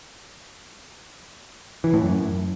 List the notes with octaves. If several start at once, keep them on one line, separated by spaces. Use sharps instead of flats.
E3
A2
F#2